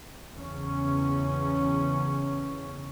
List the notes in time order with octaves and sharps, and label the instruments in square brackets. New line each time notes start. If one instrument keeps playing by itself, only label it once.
[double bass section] E2 C#3 C#4